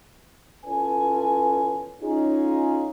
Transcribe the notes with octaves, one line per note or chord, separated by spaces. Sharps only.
E2 C#4 F4 A4 B4 G#5
C#4 D#4 F4 G#4